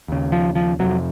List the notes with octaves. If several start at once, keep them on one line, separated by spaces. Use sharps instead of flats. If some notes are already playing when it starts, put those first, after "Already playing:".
D#2 C#3
F3
F3
F2 C3 F#3